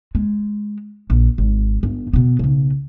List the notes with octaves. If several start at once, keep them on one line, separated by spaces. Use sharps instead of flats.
G#3
A#1
G#1
G1
B2 B3
B1 C#3